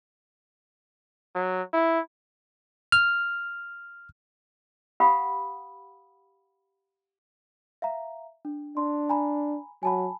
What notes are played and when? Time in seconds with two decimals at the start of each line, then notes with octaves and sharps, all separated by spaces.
1.35 F#3
1.73 E4
2.92 F6
5.00 G4 F5 F#5 B5 D#6
7.82 E5 F5 A#5
8.45 D4
8.77 D4 C6
9.09 G#5 A#5 B5
9.83 F#3 G#5 A5 B5